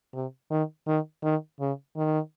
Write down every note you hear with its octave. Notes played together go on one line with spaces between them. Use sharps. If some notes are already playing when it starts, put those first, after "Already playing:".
C3
D#3
D#3
D#3
C#3
D#3